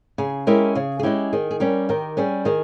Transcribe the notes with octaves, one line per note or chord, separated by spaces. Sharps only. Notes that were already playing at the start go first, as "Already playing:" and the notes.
C#3 G#4
G#3 C#4 E4 G4 A#4
C#3 G#4
G#4
G#3 C#4 E4 G4
D#3 G#4
G#4
G3 C#4 G4 A#4
D#3 G4 A#4
G3 C#4 G#4
D#3 G#4